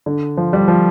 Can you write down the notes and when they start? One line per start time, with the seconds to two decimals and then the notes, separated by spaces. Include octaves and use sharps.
0.06 D3
0.37 F3
0.53 G3
0.68 F3